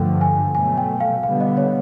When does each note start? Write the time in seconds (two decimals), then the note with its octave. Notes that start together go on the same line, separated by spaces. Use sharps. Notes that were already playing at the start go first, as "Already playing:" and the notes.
Already playing: G2 D3 F3 A3 G5
0.21 G#5
0.55 B2 F#3 A3 G#5
0.78 G5
1.00 F5
1.23 D3 G3 B3 F5
1.40 D#5
1.57 C#5